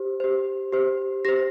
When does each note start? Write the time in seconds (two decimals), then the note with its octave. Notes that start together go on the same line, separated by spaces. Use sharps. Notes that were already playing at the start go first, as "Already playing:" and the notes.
Already playing: G4 C5
0.20 G4 C5
0.72 G4 C5
1.25 G4 C5 A#6